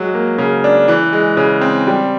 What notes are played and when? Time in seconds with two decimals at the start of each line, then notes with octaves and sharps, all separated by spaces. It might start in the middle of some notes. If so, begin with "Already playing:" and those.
Already playing: F#3 G#3
0.14 A#3
0.38 C#3
0.64 D4
0.88 E3
1.13 G#3
1.37 C#3
1.61 C4
1.87 G3